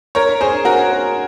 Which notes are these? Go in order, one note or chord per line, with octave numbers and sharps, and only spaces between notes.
A#4 C#5
G#4 C5
F#4 A#4